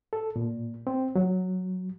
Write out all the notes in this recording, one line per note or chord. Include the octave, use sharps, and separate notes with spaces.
A4
A#2
C4
F#3